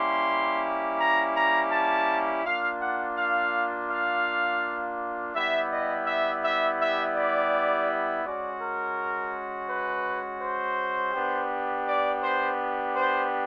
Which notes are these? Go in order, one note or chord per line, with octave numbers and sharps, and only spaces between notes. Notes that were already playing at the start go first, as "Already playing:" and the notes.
Already playing: G3 A#3 C#4 E4 G4 C6
A#5
A#5
A5
A#3 D4 F4 F5
F#5
F5
F5
G3 B3 E4 G4 E5
D#5
E5
E5
E5
D5
G#3 C#4 F#4 D5
A#4
B4
C5
B3 D4 G4
D5
C5
C5